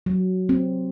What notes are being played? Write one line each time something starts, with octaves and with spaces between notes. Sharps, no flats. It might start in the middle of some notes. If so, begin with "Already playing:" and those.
F#3
C4